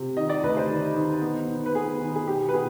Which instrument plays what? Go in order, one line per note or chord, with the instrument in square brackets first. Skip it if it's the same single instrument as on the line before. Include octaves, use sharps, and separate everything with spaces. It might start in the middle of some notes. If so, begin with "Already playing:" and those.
Already playing: [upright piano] C3
D#3 D#5
D5
D2 B4
C5
D#3
D#3
B3
D#3
B4
B3 G#4
D#3
G#4
B2 G4
B4
B2 G#4